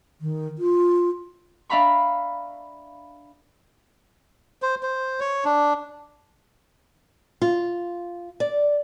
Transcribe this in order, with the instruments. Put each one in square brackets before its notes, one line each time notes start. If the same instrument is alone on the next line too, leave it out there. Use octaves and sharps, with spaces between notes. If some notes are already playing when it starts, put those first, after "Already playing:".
[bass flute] D#3
F4
[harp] D4 E5 F5 A#5 B5 C#6
[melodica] C5
C5
C#5
D4
[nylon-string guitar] F4
D5